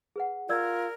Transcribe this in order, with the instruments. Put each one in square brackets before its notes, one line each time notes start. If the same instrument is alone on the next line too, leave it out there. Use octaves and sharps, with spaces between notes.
[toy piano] G#4 B4 F#5
[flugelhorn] F4 [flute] A#4 [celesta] D5 E6 G#6